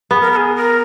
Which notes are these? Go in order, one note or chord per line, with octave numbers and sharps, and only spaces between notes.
B3 G#4
A#4
A#4
G#4
A#4